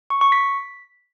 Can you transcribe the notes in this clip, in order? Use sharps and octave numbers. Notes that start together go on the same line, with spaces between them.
C#6
C#6
B6